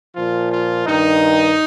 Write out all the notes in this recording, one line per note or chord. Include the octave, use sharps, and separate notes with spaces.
A#2 F3 F4
F4
G2 D#3 D#4